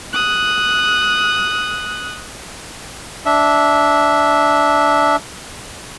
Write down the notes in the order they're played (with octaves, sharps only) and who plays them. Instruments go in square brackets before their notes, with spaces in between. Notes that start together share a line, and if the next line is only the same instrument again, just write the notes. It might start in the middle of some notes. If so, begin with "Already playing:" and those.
[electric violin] D#6 F#6
[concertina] D4 E5